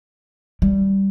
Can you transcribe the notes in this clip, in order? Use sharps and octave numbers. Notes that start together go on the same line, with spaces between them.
G3